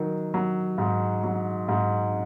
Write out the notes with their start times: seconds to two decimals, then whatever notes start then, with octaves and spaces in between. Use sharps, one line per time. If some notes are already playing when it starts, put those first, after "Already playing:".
Already playing: D#3 F#3
0.34 F#3
0.78 G#2
1.24 F#3
1.68 G#2